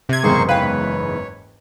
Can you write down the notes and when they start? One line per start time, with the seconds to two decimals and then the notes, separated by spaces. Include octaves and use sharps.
0.09 C3 G#6
0.23 F#1 E2 G#2 A#3 G#4 A#4 C5 C#6
0.49 B4 C#5 F5 G5